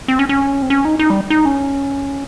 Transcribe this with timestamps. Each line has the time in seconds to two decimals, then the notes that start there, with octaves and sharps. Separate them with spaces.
0.08 C4
0.19 C#4
0.29 C#4
0.62 C4
0.70 C#4
0.85 D#4
0.99 D#4
1.10 G3
1.30 D#4
1.45 C#4